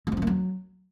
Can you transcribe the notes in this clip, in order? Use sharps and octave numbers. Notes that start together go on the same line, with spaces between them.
G#3
C4
F3
A#3
F#3